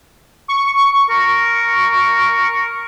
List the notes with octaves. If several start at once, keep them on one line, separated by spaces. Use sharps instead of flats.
C#6
A#4